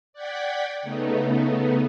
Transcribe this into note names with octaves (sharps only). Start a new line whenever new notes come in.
D5 F#5 G5 G#6 B6
C#3 A3 B3 D#4